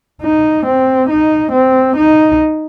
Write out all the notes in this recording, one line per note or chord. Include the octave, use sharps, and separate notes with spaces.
D#4
C4
D#4
C4
D#4